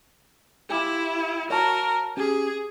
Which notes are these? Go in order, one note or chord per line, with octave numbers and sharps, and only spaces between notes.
E4 F4 G4
F#4 A#4 C#5 A5 A#5
C#4 G4 G#4